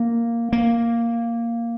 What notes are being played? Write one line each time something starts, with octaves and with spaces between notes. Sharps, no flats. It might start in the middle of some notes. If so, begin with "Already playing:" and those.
Already playing: A#3
A#3